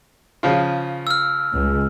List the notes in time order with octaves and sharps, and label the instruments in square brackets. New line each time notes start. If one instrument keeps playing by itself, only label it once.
[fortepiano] C#3 F3 F4
[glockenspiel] E6 F6
[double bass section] C#2 G#3